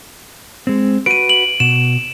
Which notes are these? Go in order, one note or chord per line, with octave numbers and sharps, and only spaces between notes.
G#3 C4
F#4 B4 D7 D#7
F#7
B2 E7